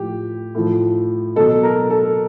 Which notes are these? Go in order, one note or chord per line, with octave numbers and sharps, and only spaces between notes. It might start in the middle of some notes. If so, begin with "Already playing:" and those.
Already playing: A2 F3 G4
A2 F3
B2 F#3 A4
A#4
A4